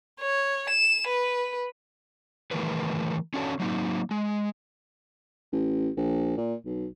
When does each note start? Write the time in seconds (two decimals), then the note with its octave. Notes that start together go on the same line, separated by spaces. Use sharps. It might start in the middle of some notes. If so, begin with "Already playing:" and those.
0.20 C#5
0.70 E7
1.07 B4
2.51 D#3 E3 A3 G#4 A#4 B4
3.34 C#4 D4 F#4 A4 C5 C#5
3.60 F#3 A#3 D#4
4.11 G#3
5.52 A1
5.97 A#1
6.37 A#2
6.65 B1